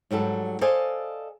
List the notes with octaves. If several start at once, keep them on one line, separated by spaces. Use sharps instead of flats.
G#2 F#3 G3 A4
A4 C5 D5 D#5 F5 G#5